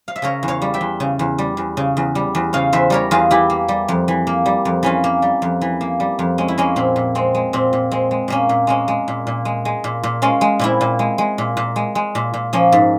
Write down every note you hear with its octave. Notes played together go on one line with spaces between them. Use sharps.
F5
E5
C#3 A#4 C#5
E2
C#5 F5
G3
E5 G5
E2
C#3
E2
G3
E2
C#3
E2
G3
E2
C#3 C#5 F5
E2 C5 E5
G3 A#4 C#5
E2 F4 G#4
E3 E4 G4
A#3
G3
F2
E3
A#3
G3
F2
E3 C#4 F4
A#3
G3
F2
E3
A#3
G3
F2
G#3 C#4
E4
G#3 A#3 C#4
A#2 C4
A#2
G#3 C4
G#3
A#2 C4
A#2
G#3 C4
G#3
A#2 A#3 C#4
A#2
G#3 A#3 C#4
G#3
A#2
A#2
G#3
G#3
A#2
A#2
G#3 C#4 F4
G#3
A#2 C4 E4
A#2
G#3
G#3
A#2
A#2
G#3
G#3
A#2
A#2
F3 A#3 C#4
G#2